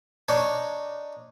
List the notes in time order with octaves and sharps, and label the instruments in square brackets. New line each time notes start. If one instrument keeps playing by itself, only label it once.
[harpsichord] D4 D#4 C#5